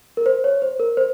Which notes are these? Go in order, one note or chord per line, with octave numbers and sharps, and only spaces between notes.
A#4
C5
C#5
C5
A#4
C5